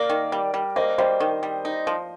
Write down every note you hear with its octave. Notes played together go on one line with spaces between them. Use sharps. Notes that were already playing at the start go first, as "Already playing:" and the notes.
Already playing: A#3 A#4 D5
D#3
G3
G3
A#3 C5 D#5
G3 C5 D#5
D#3
G3
D#4
F3